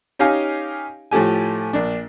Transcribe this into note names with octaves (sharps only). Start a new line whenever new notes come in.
C#4 D#4 G4 F5 G#5
A2 F3 A3 G4 G#5
A#1 D4